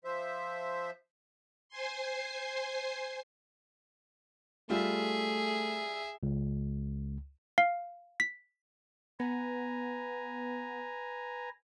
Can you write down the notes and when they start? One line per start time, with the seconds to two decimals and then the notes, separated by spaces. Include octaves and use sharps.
0.05 F3 C5 E5
1.69 C5 G#5 C6
4.70 G3 A3 F4 G#4 E5
6.23 C#2
7.58 F5
8.20 B6
9.20 B3 B4 G#5 A#5